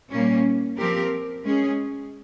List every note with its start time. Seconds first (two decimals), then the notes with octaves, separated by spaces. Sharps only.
0.11 A#2 G3 A#3 C#4
0.77 F3 C4 G4 A#4
1.43 G#3 C#4 G#4